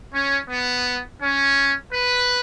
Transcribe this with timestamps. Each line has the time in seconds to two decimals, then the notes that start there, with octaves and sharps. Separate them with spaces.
0.14 C#4
0.50 B3
1.22 C#4
1.93 B4